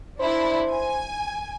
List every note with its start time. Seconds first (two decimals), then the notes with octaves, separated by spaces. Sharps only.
0.19 D4 E4 C5
0.70 G#5